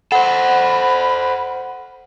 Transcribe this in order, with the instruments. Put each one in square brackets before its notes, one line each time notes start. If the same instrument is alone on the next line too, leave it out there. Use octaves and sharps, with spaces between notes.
[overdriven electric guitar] A4 C5 [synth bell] F#5 [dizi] B5